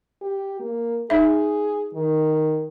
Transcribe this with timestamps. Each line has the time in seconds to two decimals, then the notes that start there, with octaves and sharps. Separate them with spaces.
0.21 G4
0.60 A#3
1.10 D#4 G#4 E5
1.95 D#3